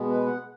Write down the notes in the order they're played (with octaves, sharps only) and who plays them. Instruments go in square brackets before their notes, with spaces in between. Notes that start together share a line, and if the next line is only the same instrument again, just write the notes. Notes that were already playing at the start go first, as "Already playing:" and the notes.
Already playing: [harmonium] B2 G#3 B3
B4
F#5